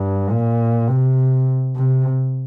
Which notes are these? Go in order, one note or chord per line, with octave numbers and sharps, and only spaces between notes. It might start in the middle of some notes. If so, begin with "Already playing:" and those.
Already playing: G2
A#2
C3
C3